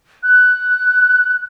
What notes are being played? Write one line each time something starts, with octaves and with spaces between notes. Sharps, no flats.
F#6